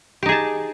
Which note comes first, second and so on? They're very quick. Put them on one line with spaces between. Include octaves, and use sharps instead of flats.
G4 D#4 G#4 A5